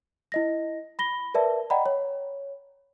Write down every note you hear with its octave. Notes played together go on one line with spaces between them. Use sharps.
E4 D#5 A#6
B5 A#6 G7
A#4 B4 D5 E5 A5
D5 D#5 F#5 G5 A#5 B5
C#5